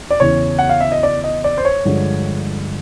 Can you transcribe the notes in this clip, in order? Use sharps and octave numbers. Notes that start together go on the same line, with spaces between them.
D5
E2 C#3 E3 C#5
F#5
F5
E5
D#5
D5
D#5
D5
C5
C#5
G2 D3 F3 G#3